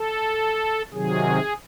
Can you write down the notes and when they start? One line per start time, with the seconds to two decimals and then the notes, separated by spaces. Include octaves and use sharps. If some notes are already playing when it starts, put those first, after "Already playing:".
Already playing: A4
0.92 C3 D#3 F#3 G#4